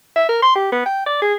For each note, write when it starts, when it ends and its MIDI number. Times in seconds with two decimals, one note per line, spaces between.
0.16 0.28 76
0.29 0.41 70
0.42 0.54 84
0.55 0.70 67
0.72 0.81 59
0.86 1.04 79
1.06 1.22 74
1.22 1.35 68